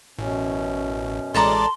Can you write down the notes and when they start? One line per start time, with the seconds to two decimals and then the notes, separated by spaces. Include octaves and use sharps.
0.19 A1 F#2 B2 C#4
1.34 A1 G#3 A4 D5 A5 A#5 C6